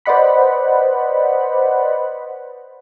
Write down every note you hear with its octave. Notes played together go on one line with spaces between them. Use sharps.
B4 C5 D5 D#5 F#5 B5